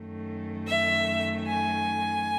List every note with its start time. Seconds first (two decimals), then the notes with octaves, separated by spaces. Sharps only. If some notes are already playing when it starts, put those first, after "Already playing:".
Already playing: F#2 D#3 A3
0.66 E5
1.46 G#5